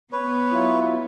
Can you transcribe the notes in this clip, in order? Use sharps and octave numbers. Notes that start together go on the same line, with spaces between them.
B3 B4 C#5
F#3 E4 F4